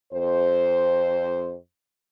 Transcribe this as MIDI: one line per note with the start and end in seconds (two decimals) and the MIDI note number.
0.13 1.56 41
0.13 1.56 72